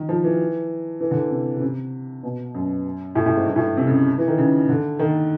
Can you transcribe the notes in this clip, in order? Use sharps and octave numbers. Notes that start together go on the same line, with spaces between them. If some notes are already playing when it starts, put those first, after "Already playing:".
Already playing: D#3
F3
E3
E3
D3
C3
C#3
C3
B2
F#2
A2
A2
G#2
G2
A2
C3
C#3
E3
D#3
C#3
D3
D#3